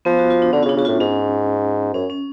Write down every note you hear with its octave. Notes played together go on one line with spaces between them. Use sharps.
F3 B3
F#4
F4
D4
D3 C#4
F4
C#3
D4
C#3 F#4
A2 F4
G#2 C#4
F#2 C#4
C#4